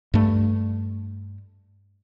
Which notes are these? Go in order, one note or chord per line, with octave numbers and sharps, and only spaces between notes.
G2 A3